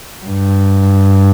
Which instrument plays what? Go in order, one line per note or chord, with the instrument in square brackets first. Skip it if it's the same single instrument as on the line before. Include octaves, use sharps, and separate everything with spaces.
[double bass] G2